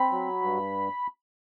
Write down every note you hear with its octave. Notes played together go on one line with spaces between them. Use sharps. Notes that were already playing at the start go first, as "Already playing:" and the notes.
Already playing: C4 B5
F#3
G2